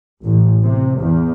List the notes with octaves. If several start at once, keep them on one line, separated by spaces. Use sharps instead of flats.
A1
C3
E2